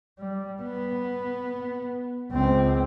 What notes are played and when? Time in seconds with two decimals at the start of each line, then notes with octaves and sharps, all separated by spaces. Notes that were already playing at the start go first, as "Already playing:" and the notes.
0.19 G3
0.62 B3
2.31 C#2 C4